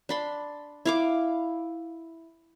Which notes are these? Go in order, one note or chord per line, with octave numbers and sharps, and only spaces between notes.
D4 B5 C6
E4 F5 D6